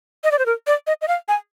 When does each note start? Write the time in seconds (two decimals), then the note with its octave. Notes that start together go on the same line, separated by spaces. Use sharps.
0.24 D#5
0.32 D5
0.39 C5
0.46 A#4
0.67 D5
0.87 D#5
1.02 D#5
1.08 F5
1.28 G#5